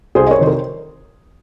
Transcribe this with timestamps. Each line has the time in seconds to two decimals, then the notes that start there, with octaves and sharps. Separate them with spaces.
0.15 C2 G#4 C5
0.27 D#5
0.31 A#4 C#5
0.39 C3 D#3 C5
0.47 A#4